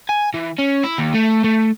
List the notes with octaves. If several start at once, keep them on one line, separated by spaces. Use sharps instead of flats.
G#5
E3
C#4
E4
D#2
A3
A3